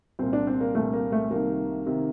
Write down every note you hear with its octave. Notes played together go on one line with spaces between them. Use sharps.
C2 A#2 C4
D4
C4
A#3
C2 A#2 A3
A#3
A3
C2 C3 D#3 A#3
C3 D#3